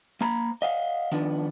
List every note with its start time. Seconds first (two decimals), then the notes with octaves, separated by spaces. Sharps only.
0.21 A#3 A#5 B5
0.62 D#5 F5 F#5
1.12 D#3 F3 B3 D4